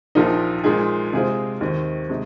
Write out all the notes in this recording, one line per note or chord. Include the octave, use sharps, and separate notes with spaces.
A#1 A#2 F3 A#3 D#4
A#2 F3 G#3 D#4 G#4
C3 G#3 F4 G#4 C5
D#2 D#3 C4
C3 G#3